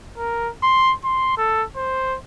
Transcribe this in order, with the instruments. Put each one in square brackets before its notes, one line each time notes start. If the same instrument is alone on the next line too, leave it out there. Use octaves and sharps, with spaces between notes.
[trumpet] A#4
C6
C6
A4
C5